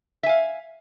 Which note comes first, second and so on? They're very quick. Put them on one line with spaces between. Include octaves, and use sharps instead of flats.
E5 G#5 F5